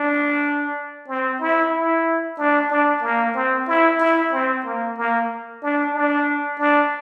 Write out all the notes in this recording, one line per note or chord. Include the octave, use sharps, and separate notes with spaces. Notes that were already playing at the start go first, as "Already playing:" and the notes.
Already playing: D4
C4
E4
E4
D4
D4
A#3
C4
E4
E4
C4
A#3
A#3
D4
D4
D4